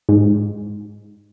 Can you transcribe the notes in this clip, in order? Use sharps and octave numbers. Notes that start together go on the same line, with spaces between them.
G#2